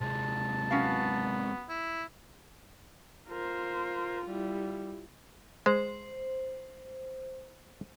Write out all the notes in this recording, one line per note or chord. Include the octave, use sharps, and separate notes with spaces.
C3 G#3 A5
B3 C#4 F#4 F5
E4
F4 A#4 C5
G3 E4
G#3 C5